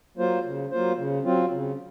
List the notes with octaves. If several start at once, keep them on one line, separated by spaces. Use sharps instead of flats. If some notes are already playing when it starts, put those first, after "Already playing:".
F#3 A#3 F4 C5
C#3
F#3 A#3 F4 C5
C#3
F#3 C4 F4
C#3